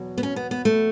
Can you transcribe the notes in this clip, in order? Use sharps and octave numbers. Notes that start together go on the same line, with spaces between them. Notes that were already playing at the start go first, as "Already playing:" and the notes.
Already playing: E2 B2 F#3
B3
C#4
B3
B3
A3